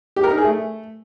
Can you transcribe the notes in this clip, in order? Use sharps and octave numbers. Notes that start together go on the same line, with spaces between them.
G4
A#4
D#4
G#4
A3